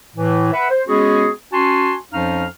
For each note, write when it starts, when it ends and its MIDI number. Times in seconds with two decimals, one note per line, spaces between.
0.15 0.48 45
0.15 0.48 52
0.52 0.67 71
0.52 0.67 76
0.52 0.67 78
0.69 0.80 72
0.87 1.28 56
0.87 1.28 59
0.87 1.28 61
0.87 1.28 66
0.87 1.28 68
1.52 1.93 61
1.52 1.93 66
1.52 1.93 80
1.52 1.93 81
1.52 1.93 84
2.12 2.44 41
2.12 2.44 53
2.12 2.44 61
2.12 2.44 63
2.12 2.44 77
2.12 2.44 89